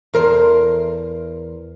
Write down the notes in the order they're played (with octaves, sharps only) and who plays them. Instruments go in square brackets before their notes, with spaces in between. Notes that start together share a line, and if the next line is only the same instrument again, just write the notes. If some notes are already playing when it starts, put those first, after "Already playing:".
[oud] E2 A#4 C5